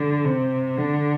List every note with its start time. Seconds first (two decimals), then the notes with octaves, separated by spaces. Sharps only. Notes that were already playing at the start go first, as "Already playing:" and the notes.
Already playing: D3
0.25 C3
0.77 D3